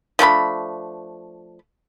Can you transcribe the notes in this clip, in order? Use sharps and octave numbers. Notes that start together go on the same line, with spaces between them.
F3 A3 D4 B5